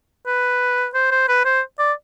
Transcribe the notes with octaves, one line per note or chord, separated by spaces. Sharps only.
B4
C5
C5
B4
C5
D5